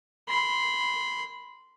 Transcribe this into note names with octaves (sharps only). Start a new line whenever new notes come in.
B5 C6